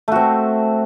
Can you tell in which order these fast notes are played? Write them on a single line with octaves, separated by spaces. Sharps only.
A3 F#4 C4